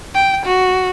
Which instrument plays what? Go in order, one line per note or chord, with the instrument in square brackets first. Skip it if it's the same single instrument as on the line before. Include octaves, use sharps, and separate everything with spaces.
[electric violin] G5
F#4